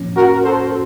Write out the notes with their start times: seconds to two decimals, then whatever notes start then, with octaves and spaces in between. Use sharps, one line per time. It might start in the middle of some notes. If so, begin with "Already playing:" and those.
Already playing: A2 F3 A#3 C#4
0.16 F#4 A#4
0.44 A4 C5